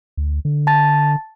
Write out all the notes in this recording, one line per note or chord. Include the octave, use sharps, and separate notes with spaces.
D2
D3
A5 A6